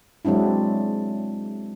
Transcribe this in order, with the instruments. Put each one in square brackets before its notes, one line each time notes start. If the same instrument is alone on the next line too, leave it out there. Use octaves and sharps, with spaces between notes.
[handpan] F#3 G#3 C4 D4 E4